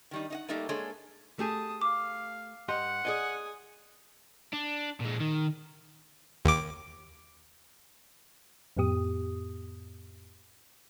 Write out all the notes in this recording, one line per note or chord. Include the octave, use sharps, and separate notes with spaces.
D#3 G3 D#4
D#4 D#5 F#5
G3 A3 A#3 D#4 G4 A4
G#3 A#3 D4 G#4 A4 C#5
A3 G4 G#4 A5 D#6
F5 D6
G2 G4 D#5 F#5 C6
G#4 D5 D#5 G#5 D#6
D4
A#2 G#3
D#3
D#2 D6
F2 A2 B3 G4 D#6